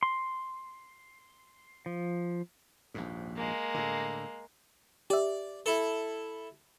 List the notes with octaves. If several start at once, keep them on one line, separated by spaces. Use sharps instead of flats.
C6
F3
A#1 D#2 G#2
G#3 A#3
A2 D3
G4 D5 E5
E4 A4